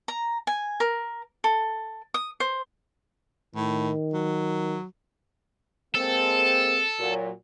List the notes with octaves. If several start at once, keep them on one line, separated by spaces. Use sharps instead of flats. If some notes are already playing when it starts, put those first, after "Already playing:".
A#5
G#5
A#4
A4
D#6
C5
A2 D#3
F#3
G#3 A#3 C4 A4
A#2 F#3